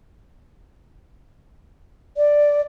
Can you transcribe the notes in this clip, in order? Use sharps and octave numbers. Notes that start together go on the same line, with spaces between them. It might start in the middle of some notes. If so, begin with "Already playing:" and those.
D5